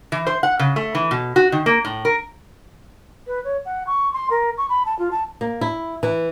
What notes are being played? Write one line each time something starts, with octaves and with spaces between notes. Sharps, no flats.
E3
C5
F#5
C#3
A3
E3
B2
F#4
D#3
A#3
A2
A#4
B4
C#5
F#5
C#6
C6
A#4
C#6
B5
A5
F4
A5
A#3
E4
E3